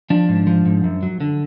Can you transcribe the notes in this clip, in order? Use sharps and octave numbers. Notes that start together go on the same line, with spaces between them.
F3 D4
G#2
F3
G#2
F#2
F#3
D3